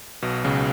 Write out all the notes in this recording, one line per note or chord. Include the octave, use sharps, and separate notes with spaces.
B1 B2
C#2 C#3